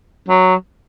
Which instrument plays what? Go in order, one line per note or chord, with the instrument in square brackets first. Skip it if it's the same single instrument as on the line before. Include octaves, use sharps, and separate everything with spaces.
[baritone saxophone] F#3